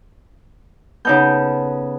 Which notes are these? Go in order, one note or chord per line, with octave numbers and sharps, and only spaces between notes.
C#3 B3 D#4 A4 G6